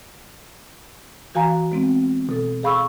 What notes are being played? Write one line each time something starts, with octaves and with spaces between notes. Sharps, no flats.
E3 F#4 F5 G#5 A#5
G#3 B3 C4
B2 A4
G#4 F5 B5 C#6 E6